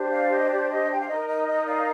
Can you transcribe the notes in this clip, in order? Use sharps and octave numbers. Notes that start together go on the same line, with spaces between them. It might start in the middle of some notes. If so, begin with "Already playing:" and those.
Already playing: D4 G4 C5
D5 F5
D#5
D5
D#5
G5
F5
D#4 A#4 D#5
D#5
D#5
D5 F5